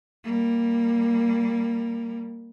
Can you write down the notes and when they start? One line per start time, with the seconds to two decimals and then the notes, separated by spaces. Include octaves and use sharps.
0.24 G3 A#3